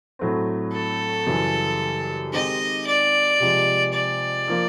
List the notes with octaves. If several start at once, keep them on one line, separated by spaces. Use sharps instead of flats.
A2 F#3 A3 C4
A4
F#2 C#3 E3 G3
D#3 G#3 C4 D#4 G4 D#5
D5
C3 F3 G#3
D5
F3 A#3